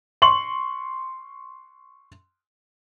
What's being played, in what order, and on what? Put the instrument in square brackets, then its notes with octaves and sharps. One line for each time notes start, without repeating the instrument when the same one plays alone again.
[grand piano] C6 C#6 F#7